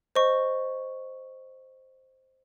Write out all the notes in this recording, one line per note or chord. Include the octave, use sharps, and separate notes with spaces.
C5 D#5 C#6